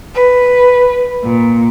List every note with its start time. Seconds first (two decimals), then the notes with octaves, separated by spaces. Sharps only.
0.14 B4
1.23 A#2